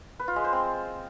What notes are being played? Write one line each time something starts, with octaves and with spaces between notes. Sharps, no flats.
B4
F4
G#3
C5
C4